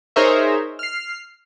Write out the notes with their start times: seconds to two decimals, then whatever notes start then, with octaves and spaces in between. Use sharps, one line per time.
0.16 D#4 G#4 A#4 C5 C#5 E5
0.79 F6 C7